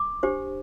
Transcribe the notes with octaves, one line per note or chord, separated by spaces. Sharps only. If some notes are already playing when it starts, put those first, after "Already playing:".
Already playing: D6
D4 G4 C5